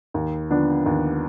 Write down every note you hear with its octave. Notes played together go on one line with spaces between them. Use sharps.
D#2
D3 F3 B3 D4
D#2